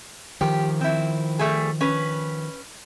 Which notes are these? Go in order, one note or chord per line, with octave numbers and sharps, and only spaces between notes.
D#3 F3 G4
C4 E4
G3 A3 G#4
C#4 B4